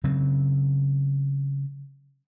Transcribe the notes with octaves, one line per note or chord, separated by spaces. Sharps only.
C#3 F#3 C4